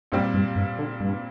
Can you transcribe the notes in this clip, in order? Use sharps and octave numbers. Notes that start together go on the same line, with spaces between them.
G2 A#2 G3 C4
G2
G2
D3
G2